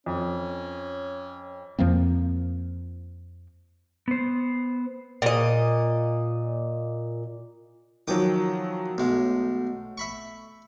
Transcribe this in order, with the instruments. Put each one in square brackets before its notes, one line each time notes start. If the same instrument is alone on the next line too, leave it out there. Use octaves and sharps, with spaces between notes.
[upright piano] F2 [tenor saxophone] C#4
[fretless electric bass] F2 F3 A#3 C4
[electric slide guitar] B3 C5
[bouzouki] A#2 D#5
[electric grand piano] D#3 F3 F#3 [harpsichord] G5 D6 D#6
[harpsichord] B1 G#3 [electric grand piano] A3
[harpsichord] E5 B5 C#6